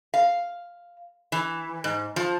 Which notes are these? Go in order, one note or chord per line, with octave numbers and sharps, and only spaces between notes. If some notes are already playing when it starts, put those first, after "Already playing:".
F5
E3
G#2
F3